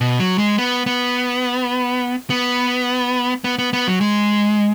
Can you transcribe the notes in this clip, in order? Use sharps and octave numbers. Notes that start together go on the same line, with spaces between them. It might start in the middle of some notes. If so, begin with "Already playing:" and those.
B2
F#3
G#3
B3
B3
B3
B3
B3
B3
F#3
G#3